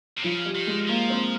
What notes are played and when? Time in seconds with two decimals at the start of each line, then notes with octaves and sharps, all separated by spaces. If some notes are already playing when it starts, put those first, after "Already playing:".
0.18 C3
0.24 C#3 F3
0.46 G3
0.56 D#3
0.67 G#3
0.88 F3 A#3
1.10 C4